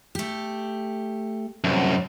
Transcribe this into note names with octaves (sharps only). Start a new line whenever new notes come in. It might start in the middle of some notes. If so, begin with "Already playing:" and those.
A3 G4
C2 F#2